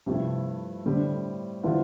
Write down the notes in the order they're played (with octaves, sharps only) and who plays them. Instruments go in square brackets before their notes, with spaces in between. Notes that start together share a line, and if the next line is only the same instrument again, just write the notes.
[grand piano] G2 F3 A3 E4 A4 [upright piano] C3
[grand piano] A2 G3 C4 [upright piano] D3
[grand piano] D3 G3 C4 F4 [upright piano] E3